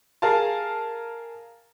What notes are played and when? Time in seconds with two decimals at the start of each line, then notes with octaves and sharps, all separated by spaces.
0.22 G#4 A#4 F5 G#5 A5